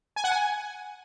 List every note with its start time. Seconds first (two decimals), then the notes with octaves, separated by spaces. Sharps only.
0.16 G#5
0.24 F#5
0.32 G#5